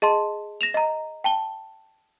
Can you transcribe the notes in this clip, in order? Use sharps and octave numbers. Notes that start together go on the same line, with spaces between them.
G#4 D#5 A5 C6
A#6 E7 F7
D#5 A#5
G5 A5 G7